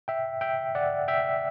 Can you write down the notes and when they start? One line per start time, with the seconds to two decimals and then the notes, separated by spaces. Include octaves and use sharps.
0.08 E5 G5
0.41 E5 G5
0.75 D5 F#5
1.08 E5 G5